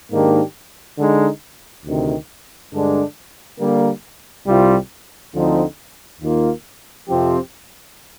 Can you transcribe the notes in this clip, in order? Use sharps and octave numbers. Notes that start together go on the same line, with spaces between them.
G#2 D#3 A#3 D4 G4
D3 G#3 D#4
D2 C3 D#3
G2 D3 G#3 D4
D3 G3 A#3
C2 C3 G3 C4 F4
D2 D3 F3 C4 D#4
D#2 D#3 A#3 F4
F2 C3 F3 C4 G4